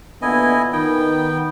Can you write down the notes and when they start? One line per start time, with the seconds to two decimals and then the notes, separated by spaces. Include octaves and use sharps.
0.22 A#2 D3 B3 E4 D#5 G#5
0.73 D#3 B3 G5